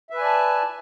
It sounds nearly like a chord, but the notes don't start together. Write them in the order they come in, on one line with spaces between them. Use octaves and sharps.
E5 B4 G#5 D5 A5